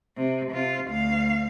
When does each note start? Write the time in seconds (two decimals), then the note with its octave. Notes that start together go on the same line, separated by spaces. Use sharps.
0.17 C3
0.52 C3 F4
0.87 D2 F5